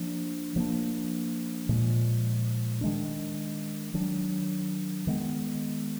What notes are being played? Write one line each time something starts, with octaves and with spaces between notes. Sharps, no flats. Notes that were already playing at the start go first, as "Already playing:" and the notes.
Already playing: F3 A#3 D4
F3 A#3 D4
A#2 F3 G#3
D#3 G#3 D4
D#3 F#3 D4
D#3 G#3 B3